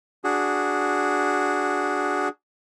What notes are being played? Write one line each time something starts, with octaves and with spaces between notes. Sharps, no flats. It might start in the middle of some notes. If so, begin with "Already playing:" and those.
D4 F#4 G#4